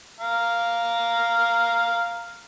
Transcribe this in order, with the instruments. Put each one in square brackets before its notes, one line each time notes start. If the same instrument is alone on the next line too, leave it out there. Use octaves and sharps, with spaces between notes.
[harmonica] F5 A#5